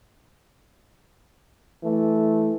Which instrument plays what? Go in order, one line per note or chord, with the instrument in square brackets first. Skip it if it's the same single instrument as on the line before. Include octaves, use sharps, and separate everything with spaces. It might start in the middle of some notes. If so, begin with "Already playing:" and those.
[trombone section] E3 A3